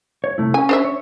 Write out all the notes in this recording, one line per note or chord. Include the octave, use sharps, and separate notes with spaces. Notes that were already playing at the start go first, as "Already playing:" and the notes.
C#5
C3 A3 E4
C#4 G#5
D4 C5 E5
C#5